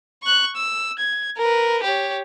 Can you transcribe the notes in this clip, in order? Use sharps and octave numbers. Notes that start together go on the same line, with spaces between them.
C#6 F#6
E6
G#6
A#4 B4
G4 C#5